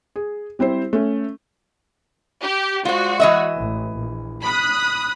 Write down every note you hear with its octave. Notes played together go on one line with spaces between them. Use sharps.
G#4
G3 C4 E4 C5
A3 C#4
G4
G#3 F4 F#4 C5 D5
E3 D#5 E5
A1
A#1
B5 D#6 F#6